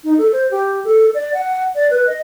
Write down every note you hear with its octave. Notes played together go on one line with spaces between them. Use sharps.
D#4
A4
C5
G4
A4
D5
F#5
D5
B4
D#5